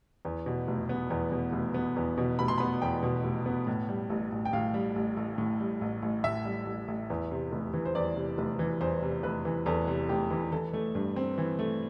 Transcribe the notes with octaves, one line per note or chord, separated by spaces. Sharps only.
E2
B2
F1
B3
E2
B2
F1
B3
E2
B2
F1 B5
C6
B3 B5
E2 G5
B2
F1
B3
A2
G3
A1
A1
G5
A2 F5
G3
A1
A1
A2
G3
A1
A1
A2 E5
G3
A1
A1
E2
C3
F1
E3
C5
E2 D5
C3
F1
E3
E2 C5
C3
F1 B4
E3
E2 A4
C3
F1 G4
E3
E3 A4
A3
G2
C4
E3
A3